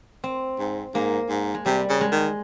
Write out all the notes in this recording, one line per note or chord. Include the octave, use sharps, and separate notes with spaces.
C4
G#2
G#2 A#3
G#2
G#3
C3 G3
C#3
G#3
D#3